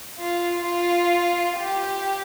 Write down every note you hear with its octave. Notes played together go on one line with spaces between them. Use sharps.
F4
F4
G4